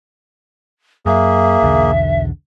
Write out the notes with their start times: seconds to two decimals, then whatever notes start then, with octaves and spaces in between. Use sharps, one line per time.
1.06 F#2 A#3 G#4 E5
1.62 B1 E2 D3